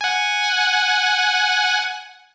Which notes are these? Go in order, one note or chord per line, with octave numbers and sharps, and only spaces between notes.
F#5 G#5